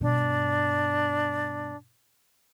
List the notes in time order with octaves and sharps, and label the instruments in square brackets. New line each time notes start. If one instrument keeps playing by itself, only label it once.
[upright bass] G2 B2 [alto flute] D4